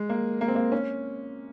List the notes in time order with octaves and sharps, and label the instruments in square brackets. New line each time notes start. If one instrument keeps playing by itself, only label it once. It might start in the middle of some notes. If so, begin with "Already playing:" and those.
Already playing: [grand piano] G#3
A#3
A#3
C4
A#3
C#4